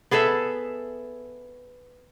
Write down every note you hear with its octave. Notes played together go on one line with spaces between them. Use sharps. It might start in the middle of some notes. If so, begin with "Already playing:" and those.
B3 G#4 A4 E5